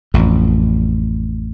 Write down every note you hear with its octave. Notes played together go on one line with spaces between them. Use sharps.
A1 F2